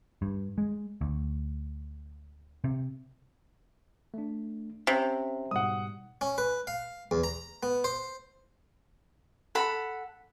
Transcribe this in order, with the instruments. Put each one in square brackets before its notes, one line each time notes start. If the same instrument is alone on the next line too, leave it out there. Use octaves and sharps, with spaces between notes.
[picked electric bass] G2
G#3
D2
C3
[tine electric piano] A3 D4
[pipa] C3 [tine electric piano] C4 C#4
[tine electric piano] G#2 B2 G3 [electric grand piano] F#5 D#6
[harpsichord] C#4
B4
F5
E2
A#5
B3
C5
[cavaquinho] A4 F#5 B5